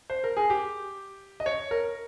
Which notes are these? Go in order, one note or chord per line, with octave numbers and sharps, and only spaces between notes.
C5
A#4
G#4
G4
D#5
C#5
A#4